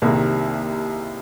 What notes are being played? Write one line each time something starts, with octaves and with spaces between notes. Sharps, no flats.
C2 C3 D#3 A#3